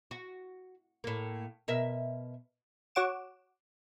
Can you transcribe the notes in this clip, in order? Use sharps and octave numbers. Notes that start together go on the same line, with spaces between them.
F#4
A2 A#3
B2 A#4 E5
F#4 C#5 F#5 D6 E7